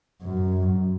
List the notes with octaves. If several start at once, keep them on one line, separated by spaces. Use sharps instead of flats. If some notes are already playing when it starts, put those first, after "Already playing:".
F#2